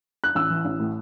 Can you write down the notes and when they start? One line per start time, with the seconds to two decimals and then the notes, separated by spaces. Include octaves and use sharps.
0.24 F#6
0.35 A1 E6
0.50 E3
0.65 A1
0.80 A2